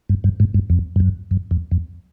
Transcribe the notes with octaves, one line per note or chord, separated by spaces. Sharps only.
G2
G2
G#2
G2
F2
G2
F#2
F#2
F2
F2